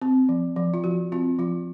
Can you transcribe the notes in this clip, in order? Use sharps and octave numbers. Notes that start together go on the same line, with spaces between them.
C4
F3
F3
F4
F3 F#4
C4 F4
F3 F4